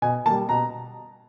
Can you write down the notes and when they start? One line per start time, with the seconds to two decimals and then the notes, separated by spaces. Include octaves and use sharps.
0.02 B2 G#5
0.26 A#3 A5
0.30 G3
0.49 B2 A#5